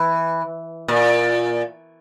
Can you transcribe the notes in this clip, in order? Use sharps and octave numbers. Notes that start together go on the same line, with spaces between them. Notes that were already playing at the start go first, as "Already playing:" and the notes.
Already playing: E3
A#2